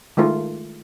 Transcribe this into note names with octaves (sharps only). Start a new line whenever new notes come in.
D#3 G#3 A3 F4